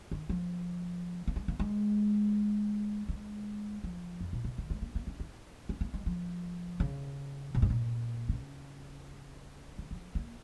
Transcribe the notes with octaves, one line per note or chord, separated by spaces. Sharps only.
D#3
F3
A#3
G#3
A#3
G#3
G#3
F3
F2
A#2
C#3
D#3
G#3
A#3
A#3
C#4
D#4
C#4
A#3
G#3
F3
C#3
A#2
G#2
A#2
C#3
D#3
F3
A#3